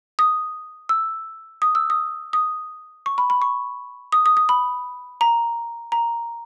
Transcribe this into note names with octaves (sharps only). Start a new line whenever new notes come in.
D#6
E6
D#6
E6
D#6
D#6
C#6
B5
B5
C#6
D#6
D#6
D#6
B5
A#5
A#5